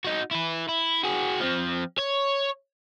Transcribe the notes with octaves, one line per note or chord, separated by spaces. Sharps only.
D#4 F#4
E4 B4
E4
F#4 G#4
F3 C4
C#5